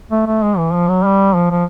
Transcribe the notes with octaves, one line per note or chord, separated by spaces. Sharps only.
A3
A3
G#3
E3
F3
F#3
G3
F3
F3